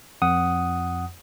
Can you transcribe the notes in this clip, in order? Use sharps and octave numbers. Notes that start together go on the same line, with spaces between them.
F2 F#5 D#6